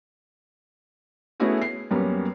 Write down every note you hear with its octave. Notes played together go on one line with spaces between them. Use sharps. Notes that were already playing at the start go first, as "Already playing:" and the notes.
A3 B3 C#4 E4 F#4 G#4
C7
F#2 G3 A#3 B3 C#4